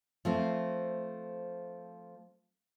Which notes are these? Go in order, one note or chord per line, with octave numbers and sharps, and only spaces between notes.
F3 A3 C4